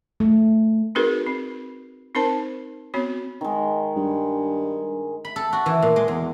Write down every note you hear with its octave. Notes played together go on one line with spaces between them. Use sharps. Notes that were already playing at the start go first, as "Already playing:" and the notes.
A3
C4 D#4 F#4 G#4 A#4 B4
C4
C4 D#4 A#4 C5 A5
B3 C4 F#4 C#5
D#3 G#3
G2
B5
A4
F#4
E3
A#2
G#3
E2